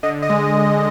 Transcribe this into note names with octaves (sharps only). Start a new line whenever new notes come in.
D3 D#5
D#5
G#3